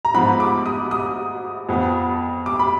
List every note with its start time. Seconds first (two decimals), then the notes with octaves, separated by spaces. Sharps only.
0.05 A#5
0.14 G#2 F3 B3 B5
0.40 D6
0.66 D#6
0.91 D#6
1.69 F2 F3 B3
2.46 D6
2.59 B5